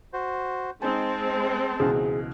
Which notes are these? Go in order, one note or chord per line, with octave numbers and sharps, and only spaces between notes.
F#4 C5
G#3 C4 D#4 C5 G#5 A5
C#2 B2 E3 G#4